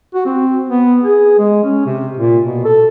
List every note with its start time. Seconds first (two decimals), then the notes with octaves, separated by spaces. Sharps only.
0.14 F#4
0.26 C4
0.70 B3
1.03 G#4
1.39 G#3
1.63 C#4
1.86 C3
2.17 A#2
2.45 B2
2.65 A4